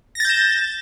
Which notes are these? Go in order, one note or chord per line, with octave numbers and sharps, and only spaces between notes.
G6 A6 A#6 E7